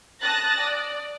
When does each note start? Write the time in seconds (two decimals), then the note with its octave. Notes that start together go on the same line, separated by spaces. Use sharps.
0.22 A5 D#6 F#6 A6 A#6
0.60 D5